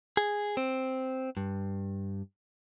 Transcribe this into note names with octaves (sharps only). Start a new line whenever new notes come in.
G#4
C4
G2